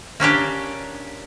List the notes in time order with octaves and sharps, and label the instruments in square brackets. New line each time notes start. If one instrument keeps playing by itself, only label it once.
[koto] A#3 C#4 D4 G4